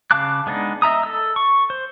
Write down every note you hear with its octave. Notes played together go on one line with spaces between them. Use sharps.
C#3 F5 A5 D6 F#6
G#3 B3 D4 D#4
D#5 E5 A#5 D#6
A4 E6
C#6
C5